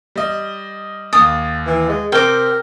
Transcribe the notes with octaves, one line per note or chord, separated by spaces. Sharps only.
G3 D#5
D#2 G#5 D#6 A6
E3
G#3
C3 C4 A#4 G5 D6